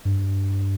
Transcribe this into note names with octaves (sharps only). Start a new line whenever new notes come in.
G2